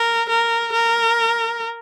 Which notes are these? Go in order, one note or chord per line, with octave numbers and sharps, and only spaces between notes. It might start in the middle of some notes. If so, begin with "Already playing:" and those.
Already playing: A#4
A#4
A#4